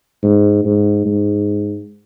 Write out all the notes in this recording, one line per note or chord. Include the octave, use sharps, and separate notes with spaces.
G#2
G#2
G#2